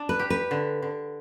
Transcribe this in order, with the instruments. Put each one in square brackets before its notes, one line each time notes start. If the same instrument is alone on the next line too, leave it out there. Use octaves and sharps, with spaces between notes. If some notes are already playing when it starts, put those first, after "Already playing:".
Already playing: [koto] D4
[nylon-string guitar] B4
[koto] G4
[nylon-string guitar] B4
[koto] D3
D3